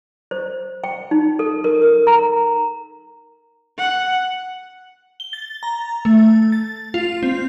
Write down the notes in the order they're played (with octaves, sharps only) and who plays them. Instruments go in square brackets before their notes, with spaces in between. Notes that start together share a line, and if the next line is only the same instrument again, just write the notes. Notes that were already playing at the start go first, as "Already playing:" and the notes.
[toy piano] C5
G5
D#4
A4
A#4
A#4
A#5
[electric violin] F#5
[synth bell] G7
A6
A#5
A3
A6
F4
C4